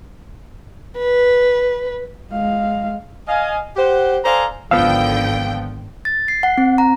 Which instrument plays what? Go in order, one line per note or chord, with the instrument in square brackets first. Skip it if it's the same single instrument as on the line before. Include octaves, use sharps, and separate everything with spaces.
[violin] B4
[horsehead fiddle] G#3 F5
[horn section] D#5 F5 G#5
G4 C5 F#5
A4 C5 D5 F5 G#5 A#5
[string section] G#1 D3 G5 [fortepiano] F3 B3 [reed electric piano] F5 E6
[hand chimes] A6
C7
F#5
C4
A#5